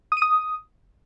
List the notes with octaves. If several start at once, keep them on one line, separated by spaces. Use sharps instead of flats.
D#6
D#7
D#6